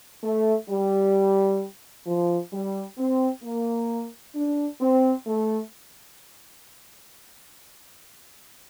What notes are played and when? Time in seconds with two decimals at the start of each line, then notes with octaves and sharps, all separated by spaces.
0.24 A3
0.69 G3
2.07 F3
2.52 G3
2.98 C4
3.44 A#3
4.35 D4
4.81 C4
5.27 A3